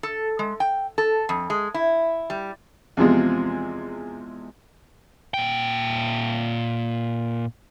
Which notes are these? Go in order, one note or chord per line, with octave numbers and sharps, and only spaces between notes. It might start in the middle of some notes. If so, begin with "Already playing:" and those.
A4
G#3
G5
A4
F2
G#3
E4
G3
E2 C3 F3 G#3
A#2 G5